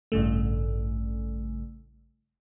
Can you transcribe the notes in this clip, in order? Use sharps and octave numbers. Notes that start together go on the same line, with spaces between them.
A1 G2 C#3 A3